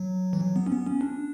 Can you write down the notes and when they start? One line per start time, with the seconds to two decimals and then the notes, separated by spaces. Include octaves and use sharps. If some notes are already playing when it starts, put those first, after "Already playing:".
Already playing: F#3
0.33 E3
0.41 F#3
0.56 B3
0.66 C#4
0.72 B3
0.86 C#4
1.01 D4